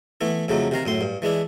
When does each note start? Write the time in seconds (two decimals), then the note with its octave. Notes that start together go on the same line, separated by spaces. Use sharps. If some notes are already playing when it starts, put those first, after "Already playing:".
0.21 E3 A3 B3 E4
0.48 F2 C#3 F#3 A3 D#4
0.71 C3 D#3 F5 A#5
0.85 F#2 A2 C6
1.01 G2
1.22 E3 G#3 D4 E4